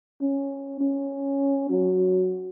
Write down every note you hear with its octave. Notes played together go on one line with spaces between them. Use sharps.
C#4
C#4
F#3